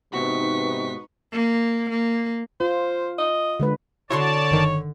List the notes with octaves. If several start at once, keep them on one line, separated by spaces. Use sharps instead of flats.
G#2 C3 B3 D#4 F#4 B4 C#6 B6
A#3
A#3
F4 C5
D#5
D3 G#3 B4
D3 E4 F#4 C#5 D5 A5 C6
G1 D#3